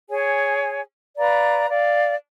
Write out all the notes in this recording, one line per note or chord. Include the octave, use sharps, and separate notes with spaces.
G#4 C#5 G#5
B4 D5 F5 A#5
D5 F5